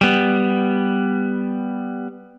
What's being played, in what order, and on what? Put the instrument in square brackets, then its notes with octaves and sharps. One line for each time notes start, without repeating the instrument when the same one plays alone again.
[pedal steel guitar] G3 B3